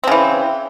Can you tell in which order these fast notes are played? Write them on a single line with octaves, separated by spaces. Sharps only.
C4 C#3 E3